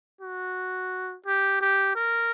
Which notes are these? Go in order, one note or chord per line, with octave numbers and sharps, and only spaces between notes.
F#4
G4
G4
A#4